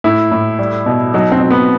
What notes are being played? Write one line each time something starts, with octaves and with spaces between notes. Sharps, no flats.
A2 E4
A2
G3
B2
F#3 D#4
C4
B2
B3